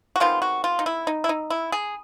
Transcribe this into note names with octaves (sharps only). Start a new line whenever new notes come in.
F#4
C3 D#3 G#3 B3 F4
F#4
F4
D#4
E4
D#4
E4
D#4
E4
G#4